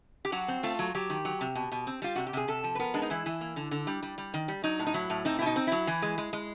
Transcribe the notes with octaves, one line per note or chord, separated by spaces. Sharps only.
G4
F#3 F#4
C4
A3 F4
F#3
F#3 G4
D#3
F#3
C3
B2
B2
C4
G3 F4
C3 F#4
G4
C3 G#4
C3 A4
F3
B4
B3 A#4
G#3 D4
D#4
E3 E4
E3
A#3
D3
D3
G3
G3
G3
D#3
G3
F#3 D#4
A2
D#4
F#3 E4
A2
C4 D#4
E4
B2 D#4
C4
F#3 E4
E3
G#3
G#3
G#3